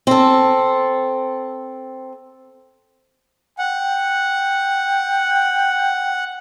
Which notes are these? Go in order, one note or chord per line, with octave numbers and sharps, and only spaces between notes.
C4 A4
F#5 G5